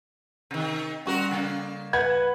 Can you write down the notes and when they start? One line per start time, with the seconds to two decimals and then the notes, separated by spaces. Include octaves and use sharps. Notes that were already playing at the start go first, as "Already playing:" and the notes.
0.51 C3 D#3
1.06 A#2 G3 C#4 F#4 A#4
1.31 C#3 A#3
1.93 B4 F#5 G#6